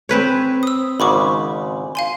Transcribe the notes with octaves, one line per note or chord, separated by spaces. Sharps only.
C4 B4 C#5
D#6 E6
G#1 G#2 C#3 B5 C#6 D6
F5 G#5 C6